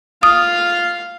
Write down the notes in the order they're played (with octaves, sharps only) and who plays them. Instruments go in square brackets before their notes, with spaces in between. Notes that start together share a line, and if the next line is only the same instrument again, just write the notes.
[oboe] F4 [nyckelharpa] F5 [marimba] D#6